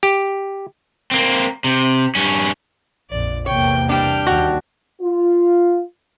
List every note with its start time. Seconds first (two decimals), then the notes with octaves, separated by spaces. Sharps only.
0.03 G4
1.11 A#3 C4
1.64 C3
2.15 G2 C#4
3.10 A#1 F2 D5
3.46 E2 C3 A#3 C#5 G5
3.89 G3 D4 G5 F6
4.27 D#2 F#4
5.01 F4